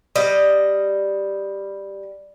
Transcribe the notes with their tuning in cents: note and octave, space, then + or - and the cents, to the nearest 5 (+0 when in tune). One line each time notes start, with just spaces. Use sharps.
G3 +5 D#5 +0